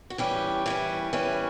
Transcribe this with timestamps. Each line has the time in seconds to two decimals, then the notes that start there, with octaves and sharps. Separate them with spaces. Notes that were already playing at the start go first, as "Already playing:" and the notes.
0.10 F#4
0.18 E3 G3 C#4 G4
0.66 E3 G3 C#4
1.13 E3 G3 C#4